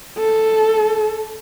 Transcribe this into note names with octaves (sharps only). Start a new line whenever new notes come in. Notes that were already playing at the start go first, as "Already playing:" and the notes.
A4